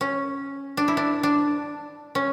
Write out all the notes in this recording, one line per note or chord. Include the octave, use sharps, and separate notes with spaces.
C#4
D4
E4
D4
D4
C#4